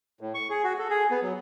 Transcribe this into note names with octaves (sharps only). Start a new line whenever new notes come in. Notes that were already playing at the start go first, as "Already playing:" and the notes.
A2
C#6
G#4
F#4
A4
G#4
B3
F#3